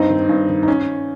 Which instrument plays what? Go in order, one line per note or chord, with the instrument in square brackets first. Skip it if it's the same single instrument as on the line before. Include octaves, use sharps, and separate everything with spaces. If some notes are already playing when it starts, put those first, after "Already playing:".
Already playing: [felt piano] G2 C4 D#4
D#3
G2
D#3
D#4
C#4